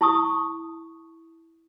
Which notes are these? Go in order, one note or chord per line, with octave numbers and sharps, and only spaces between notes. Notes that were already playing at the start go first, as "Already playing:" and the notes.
E4 A5 C#6 D#6